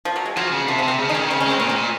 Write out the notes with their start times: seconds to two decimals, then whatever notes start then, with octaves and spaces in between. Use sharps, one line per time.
0.05 F3
0.16 F#3
0.26 G#3
0.37 F3 F#3
0.52 C#3
0.67 C3 F3
0.79 F3
0.83 C3
0.88 C4
0.99 C#3
1.09 D#3 D#4
1.15 C#4
1.20 D#3
1.31 C#3 C4
1.40 C#4
1.46 G#3 C4
1.60 A#2 C#4
1.70 C4
1.77 A#2